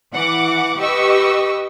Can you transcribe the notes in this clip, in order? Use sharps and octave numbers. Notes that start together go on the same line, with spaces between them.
E3 F#5 D6
G4 B4 D#5 C#6 E6